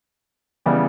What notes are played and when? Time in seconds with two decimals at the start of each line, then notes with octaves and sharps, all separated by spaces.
0.66 C#3 E3 G3 B3 E4